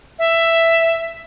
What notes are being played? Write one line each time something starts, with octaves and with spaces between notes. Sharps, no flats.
E5